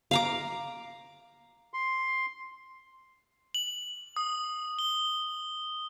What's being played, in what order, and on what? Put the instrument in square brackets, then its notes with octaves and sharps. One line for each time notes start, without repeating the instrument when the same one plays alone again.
[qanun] F5 A#5 D6
[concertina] C6
[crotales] F#7
D#6
G7